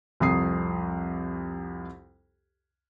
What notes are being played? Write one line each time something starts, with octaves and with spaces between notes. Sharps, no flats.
C2 F2 D#6 C7